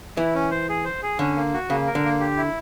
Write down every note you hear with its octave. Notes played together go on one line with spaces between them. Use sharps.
E3 E4
C#4
C5
G#4
C5
G#4
D3 C#4
A#3
F#4
C#3 A#3
A#4
D3
A#3
G4
E4